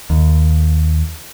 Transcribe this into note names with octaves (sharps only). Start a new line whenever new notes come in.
D#2